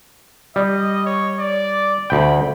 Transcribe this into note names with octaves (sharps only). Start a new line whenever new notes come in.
G3 D#5
C#5
D5
D2 G5 B5